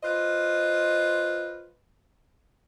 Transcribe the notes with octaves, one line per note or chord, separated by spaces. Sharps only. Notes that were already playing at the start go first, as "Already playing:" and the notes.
F4 B4 C5 D#5